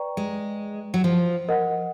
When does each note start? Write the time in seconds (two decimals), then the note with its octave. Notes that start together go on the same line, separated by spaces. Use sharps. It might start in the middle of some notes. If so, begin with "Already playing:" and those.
Already playing: B4 D5 G5 A#5 C#6
0.17 G#3
0.94 F#3
1.04 F3
1.49 A#4 D#5 F#5